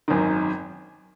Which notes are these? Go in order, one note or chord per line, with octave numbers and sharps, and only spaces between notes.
G#1 F#2 D#3